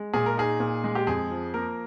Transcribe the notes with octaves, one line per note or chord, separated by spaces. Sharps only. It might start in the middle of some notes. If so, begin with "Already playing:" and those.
Already playing: G#3
A#2 G#4
A#4
D#4 G#4
A#2
G#3
G4
F2 G#4
F3
A#3 A#4